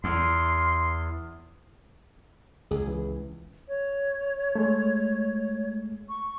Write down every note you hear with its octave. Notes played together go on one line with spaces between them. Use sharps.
E2 C6
C#2 G#4
E3
C#5
G#3 A3
C#6